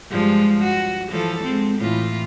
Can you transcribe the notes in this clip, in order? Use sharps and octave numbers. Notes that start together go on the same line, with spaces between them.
G2 F3 G#3
F#4
E3 F3 A4
G#3 C4
A2 E3 F4